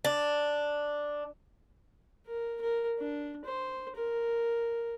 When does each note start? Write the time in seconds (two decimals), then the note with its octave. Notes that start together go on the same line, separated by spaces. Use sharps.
0.05 D4
2.27 A#4
2.62 A#4
2.98 D4
3.44 C5
3.95 A#4